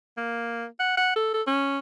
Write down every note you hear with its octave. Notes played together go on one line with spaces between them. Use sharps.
A#3
F#5
F#5
A4
A4
C#4